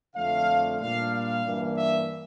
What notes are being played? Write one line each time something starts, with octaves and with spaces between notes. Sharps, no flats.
F2 D3 F3 A3 F5
A#2 G3 D4 F5
F5
G2 E3 A#3 D4
E5